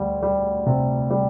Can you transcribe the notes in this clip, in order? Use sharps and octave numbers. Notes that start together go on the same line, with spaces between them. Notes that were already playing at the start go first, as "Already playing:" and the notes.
Already playing: D2 G3
G3
C3
G3